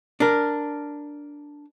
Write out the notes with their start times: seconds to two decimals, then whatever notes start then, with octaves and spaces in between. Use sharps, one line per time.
0.20 D4 A#4